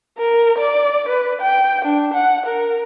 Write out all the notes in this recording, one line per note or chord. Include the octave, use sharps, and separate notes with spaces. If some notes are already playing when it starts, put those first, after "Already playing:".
A#4
D5
B4
G5
D4
F#5
A#4